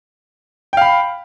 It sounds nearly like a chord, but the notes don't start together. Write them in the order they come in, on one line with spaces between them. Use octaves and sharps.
G5 F5 B5